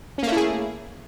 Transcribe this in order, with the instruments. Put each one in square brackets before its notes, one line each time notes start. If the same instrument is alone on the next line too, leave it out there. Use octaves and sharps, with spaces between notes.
[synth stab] C#4
A#3
A3
E4
G#4